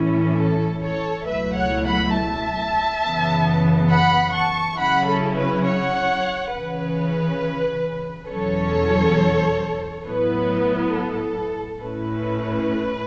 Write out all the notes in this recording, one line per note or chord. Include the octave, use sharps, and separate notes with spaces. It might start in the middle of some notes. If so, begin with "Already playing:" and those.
Already playing: A2 E3 C#4 E4
A4
A4 C#5
C#2 B2 F#3 A3 E4 B4 E5
C#5 F#5
F#5 B5
E5 A5
F#2 C#3 E3 B3
F#5 B5
A5 C#6
C#3 F#3 C#4 E4 F#5 B5
A4
B4
C#5 F#5
C#3 E3 C#4 B4
E2 B2 F#3 C#4 A4 C#5
A2 F#3 B3 E4 B4
A4
A2 A3 C#4 E4 B4